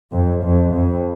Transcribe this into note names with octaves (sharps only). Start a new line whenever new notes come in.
F2
F2
F2